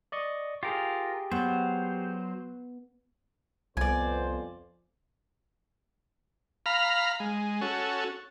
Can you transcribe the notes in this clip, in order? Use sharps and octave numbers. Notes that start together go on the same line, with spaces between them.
D5 D#5 C#6
F4 G4 G#4 A#4
F#3 B3 C5
C2 F2 B3 C5 D5 G#5
F5 A#5 B5 F6
G#3
C#4 F#4 A4